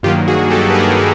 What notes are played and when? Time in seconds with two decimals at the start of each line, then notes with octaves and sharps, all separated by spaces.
0.03 G2 D#3 F#3 A#3 F4 G4
0.28 F#4 G#4
0.50 G4 A4
0.70 B4
0.74 G#4 A#4
0.99 G#4